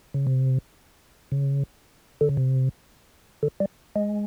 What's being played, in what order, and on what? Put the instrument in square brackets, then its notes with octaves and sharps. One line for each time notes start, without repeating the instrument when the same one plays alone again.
[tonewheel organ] C#3
C3
C#3
D3
C#3
C3
D3
G3
G#3